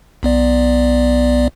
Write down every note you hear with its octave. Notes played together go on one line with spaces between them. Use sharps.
B1 B3 D5